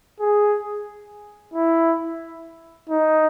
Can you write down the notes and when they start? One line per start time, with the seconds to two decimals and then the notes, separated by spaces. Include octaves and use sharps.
0.20 G#4
1.54 E4
2.89 D#4